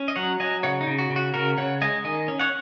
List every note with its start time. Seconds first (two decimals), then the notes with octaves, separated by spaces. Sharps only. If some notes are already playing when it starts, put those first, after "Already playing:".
Already playing: C#4
0.08 D#5
0.16 F#3 C#5 F#5
0.40 F#3 D#5 G#5
0.63 C#3 C#5 F#5
0.81 D#4
0.87 C#3
0.98 F#4
1.10 C#3
1.16 F#4
1.34 C#3 F#4 A#4
1.58 C#3 C#5 F#5
1.81 G#3 D#5 G#5
2.04 D#3 D#5 G#5
2.28 C#4
2.39 C#5 F#5